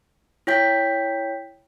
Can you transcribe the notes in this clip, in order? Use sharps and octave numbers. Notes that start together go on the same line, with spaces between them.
E4 C#5 G5 G6 B6